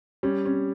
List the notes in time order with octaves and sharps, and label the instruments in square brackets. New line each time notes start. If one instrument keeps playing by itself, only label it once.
[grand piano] G3 [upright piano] C#4
[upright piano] C#4